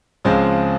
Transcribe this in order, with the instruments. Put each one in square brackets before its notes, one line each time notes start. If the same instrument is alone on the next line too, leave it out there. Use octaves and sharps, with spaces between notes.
[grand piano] C#2 C#3 F3 G#3 C4